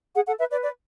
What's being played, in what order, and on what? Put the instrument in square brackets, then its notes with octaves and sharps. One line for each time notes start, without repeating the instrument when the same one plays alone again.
[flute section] G#4 [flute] F#5
[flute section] A4 [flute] F#5
[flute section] B4 [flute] E5
[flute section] B4 [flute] D5
[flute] D5